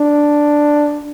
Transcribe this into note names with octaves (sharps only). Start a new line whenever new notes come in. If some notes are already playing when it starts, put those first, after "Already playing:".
Already playing: D4